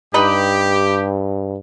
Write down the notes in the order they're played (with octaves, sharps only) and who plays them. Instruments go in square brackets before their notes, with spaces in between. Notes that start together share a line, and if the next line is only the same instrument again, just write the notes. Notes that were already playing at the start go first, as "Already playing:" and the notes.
[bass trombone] G2 [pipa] D#4 B4 [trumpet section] G4